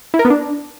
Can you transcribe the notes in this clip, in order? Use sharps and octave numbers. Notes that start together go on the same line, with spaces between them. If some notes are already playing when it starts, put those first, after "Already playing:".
E4
A#4
B3
D4